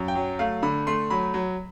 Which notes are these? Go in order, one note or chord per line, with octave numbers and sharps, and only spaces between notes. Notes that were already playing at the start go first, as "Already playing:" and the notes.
Already playing: F#2
G5
F#3
A3 F5
D3 B5
A3 C6
F#3 B5
F#3